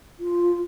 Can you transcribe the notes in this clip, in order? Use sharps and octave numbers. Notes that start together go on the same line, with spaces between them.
F4